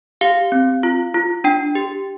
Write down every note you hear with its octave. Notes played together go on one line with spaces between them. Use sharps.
G4 F5
C4
F4
F4
D4 G5
G4